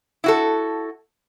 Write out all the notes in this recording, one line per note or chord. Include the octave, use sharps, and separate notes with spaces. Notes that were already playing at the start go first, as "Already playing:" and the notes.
E4 F#4 A4